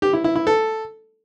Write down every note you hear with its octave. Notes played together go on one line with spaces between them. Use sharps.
G4
E4
E4
E4
A4